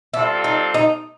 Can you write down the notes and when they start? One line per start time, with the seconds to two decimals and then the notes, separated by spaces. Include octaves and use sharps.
0.14 G3 C4 E4 F4 A4 D5
0.44 D#4
0.74 D#4